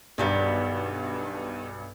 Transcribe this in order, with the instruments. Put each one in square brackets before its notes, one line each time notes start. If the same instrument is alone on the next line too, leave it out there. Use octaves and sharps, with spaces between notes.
[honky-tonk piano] B1 G2 [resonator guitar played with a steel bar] D#3 G3 B3